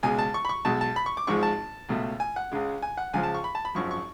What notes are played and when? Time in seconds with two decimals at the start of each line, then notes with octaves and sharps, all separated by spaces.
0.03 C#2 B2 G#3 G#5
0.19 A5
0.34 C#6
0.45 B5
0.49 C#6
0.65 B1 B2 G#3 A5
0.81 A5
0.96 B5
1.06 C#6
1.17 D6
1.27 G#1 G#2 F3 G#3 C#6
1.43 A5
1.89 C#2 B2 A3
2.20 G#5
2.36 F#5
2.52 C#2 C#3 G#3
2.82 G#5
2.97 F#5
3.14 C#2 C#3 F3 G#3 G#5
3.23 A5
3.34 C#6
3.44 B5
3.55 A5
3.65 B5
3.75 G#1 F#2 F3 C#6
3.91 C#6